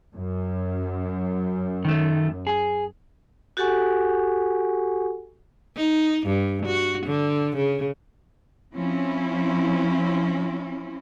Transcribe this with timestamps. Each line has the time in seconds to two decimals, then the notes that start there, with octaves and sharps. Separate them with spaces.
0.15 F#2
1.85 D#3 A3
2.47 G#4
3.57 F#4 G4 A4 F#5 G#5 C#6
5.77 D#4
6.27 G2
6.66 F#4
7.06 D3
7.57 C#3
8.75 F3 C4 C#4 E4